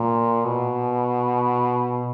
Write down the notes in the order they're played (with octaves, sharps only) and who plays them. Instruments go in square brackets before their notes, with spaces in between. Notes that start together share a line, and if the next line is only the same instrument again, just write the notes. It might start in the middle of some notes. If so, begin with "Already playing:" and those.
Already playing: [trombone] A#2
B2